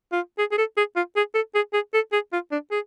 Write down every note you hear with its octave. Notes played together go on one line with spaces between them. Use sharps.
F4
G#4
G#4
A4
G#4
F4
G#4
A4
G#4
G#4
A4
G#4
F4
D4
G#4